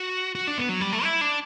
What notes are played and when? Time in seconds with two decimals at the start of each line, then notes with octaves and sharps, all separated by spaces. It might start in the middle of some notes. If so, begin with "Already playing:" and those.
Already playing: F#4
0.35 F#4
0.47 D4
0.58 B3
0.69 F#3
0.81 G3
0.93 A3
1.04 E4
1.21 D4